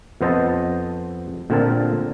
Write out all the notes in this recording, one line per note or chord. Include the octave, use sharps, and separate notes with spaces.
F2 B3 C5 D#5 A5
A#2 D3 C4 A#4 A5